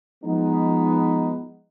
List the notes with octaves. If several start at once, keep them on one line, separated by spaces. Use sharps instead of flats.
F3 G#3 B3 D#4